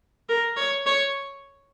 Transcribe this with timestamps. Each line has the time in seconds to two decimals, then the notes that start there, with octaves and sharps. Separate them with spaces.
0.29 A#4
0.57 C#5
0.86 C#5